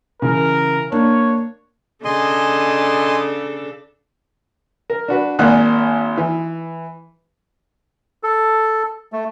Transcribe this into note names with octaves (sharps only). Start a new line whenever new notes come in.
C#3 E3 A#4
A#3 D4 C#5
C#3 D4 A4 D#5 G#5 C6
A#4
D4 F#4 B4
G#1 A#3 D5 F#5 G#5 F#6
E3
A4
A3